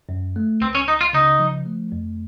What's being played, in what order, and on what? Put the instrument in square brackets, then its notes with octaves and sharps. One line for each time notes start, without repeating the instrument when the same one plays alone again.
[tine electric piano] F#2
A3
[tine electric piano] C#2 [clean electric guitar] C4
[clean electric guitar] C#4
[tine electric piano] C#2 [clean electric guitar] D#4
[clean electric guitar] F4
[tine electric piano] C#3 [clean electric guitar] D#4
[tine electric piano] F3
A3
F2